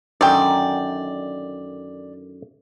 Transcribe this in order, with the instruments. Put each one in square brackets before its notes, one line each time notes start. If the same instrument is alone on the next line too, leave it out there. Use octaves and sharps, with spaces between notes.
[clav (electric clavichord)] F#2 D3 D#3 [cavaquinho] D5 G5